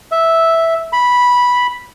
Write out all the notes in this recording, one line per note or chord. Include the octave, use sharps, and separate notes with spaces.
E5
B5